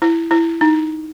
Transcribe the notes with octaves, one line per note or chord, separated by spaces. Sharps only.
E4
E4
D#4